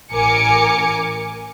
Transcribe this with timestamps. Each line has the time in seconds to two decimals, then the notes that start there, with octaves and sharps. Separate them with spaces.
0.12 A1 A#4 G#5 D6 C#7